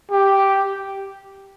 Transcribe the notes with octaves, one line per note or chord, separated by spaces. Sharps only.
G4